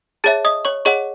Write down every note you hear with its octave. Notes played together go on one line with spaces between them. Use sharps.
G#4 C#5 E5 A5 A6
D#5 D#6
C#5 C#6
G#4 C#5 D#5 F#5 C#6